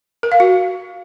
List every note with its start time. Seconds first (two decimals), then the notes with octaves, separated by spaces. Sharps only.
0.23 A#4
0.32 F5
0.40 F#4